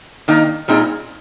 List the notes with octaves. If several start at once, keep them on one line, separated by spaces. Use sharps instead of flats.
D#3 A#3 D#4
A#2 G3 C4 D#4 G#4